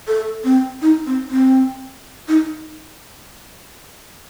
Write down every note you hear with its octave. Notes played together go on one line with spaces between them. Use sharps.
A4
C4
D#4
C4
C4
D#4